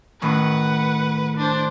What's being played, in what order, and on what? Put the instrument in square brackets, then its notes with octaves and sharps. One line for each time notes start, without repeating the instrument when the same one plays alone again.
[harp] A2 D#3 C#4 [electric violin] B4 F#5
[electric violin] D4 C5